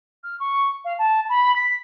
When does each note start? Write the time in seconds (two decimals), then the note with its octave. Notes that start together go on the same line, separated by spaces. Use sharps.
0.24 F6
0.40 C#6
0.85 F5
0.99 A5
1.29 B5
1.56 B6